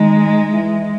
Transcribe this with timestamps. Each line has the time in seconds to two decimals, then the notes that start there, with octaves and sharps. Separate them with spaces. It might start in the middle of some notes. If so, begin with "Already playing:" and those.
Already playing: D#3 G#3 D#4
0.52 E3 E4